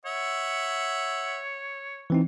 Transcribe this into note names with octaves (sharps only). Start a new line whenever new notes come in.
C#5 E5 F#5
E3 C4 D#4